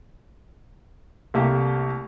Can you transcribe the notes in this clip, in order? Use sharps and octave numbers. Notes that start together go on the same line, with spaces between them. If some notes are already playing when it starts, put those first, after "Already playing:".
C2 A3 A#3 G4